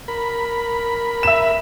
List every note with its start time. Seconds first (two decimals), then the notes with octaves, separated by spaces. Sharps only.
0.08 A#4 B5
1.23 E5 E7